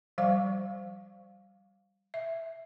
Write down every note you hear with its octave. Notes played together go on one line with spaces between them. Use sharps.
F3 G3 C5 F5 C#6 D6
E5